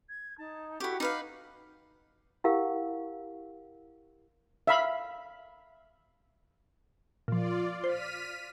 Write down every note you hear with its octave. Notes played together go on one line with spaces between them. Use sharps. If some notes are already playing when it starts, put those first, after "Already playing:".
G#6
D#4 A5
E4 F#4 G4 A4 C#6
D#4 B4 F5 D6 F6
E4 G4 A#4 F5 F#5
E5 F5 B5
A#2 F3 F4 D5
C5 F6 B6 D#7